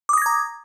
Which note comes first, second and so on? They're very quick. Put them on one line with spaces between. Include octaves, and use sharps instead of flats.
D6 D#6 A#6 G#6 A#5